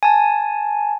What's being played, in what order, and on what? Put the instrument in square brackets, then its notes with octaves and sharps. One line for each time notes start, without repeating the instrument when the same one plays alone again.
[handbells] G#5 A5